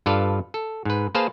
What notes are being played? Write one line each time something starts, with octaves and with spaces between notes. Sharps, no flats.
G2 F4 A4 B4 D5 F5
A4
G#2 B4
A#3 G#4 B4 C5 F5 A5